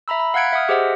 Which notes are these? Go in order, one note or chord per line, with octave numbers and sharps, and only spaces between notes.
E5 A#5 B5 E6
B5
F5 F#5 F#6 G#6 C#7 D7
E5 F#5 D#6 F6
G4 G#4 C5 D#5 E5 F#5